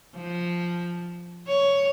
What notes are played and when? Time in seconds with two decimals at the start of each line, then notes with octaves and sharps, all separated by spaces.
0.16 F3
1.47 C#5